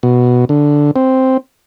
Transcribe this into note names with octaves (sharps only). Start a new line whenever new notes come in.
B2
D3
C4